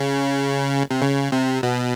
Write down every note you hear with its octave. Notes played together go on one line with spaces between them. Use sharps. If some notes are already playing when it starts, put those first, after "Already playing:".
Already playing: C#3
C3
C#3
C3
B2